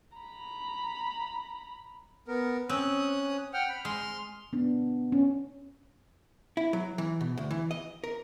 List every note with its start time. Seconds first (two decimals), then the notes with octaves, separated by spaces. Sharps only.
0.18 A#5 B5
2.28 B3 A#4
2.69 C4 C#4 D#6 F#6
3.54 F#5 G5 F6
3.69 B5
3.85 G#3 C6 F6
4.53 B3 D4
5.12 C#4
6.57 E4
6.73 F#3
6.98 E3
7.21 B2
7.37 D2
7.51 E3
7.71 D#5
8.04 A#4